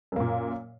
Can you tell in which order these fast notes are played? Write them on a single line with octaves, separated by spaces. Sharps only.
F#2 A#3 A#2